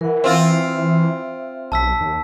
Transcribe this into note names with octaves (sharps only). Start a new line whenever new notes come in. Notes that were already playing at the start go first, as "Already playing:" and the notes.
E3 A#4 F#5
C4 F4 E5
B1 A5 E6 B6
D#2